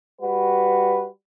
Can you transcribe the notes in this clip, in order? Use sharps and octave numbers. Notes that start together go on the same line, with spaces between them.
G3 F#4 B4